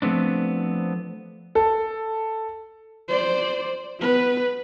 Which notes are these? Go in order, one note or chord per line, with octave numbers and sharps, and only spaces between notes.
F3 A3 B3 C4 D4
A4
C5 D5
B3 B4